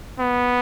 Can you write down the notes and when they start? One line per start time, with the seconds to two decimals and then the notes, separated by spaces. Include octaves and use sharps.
0.19 B3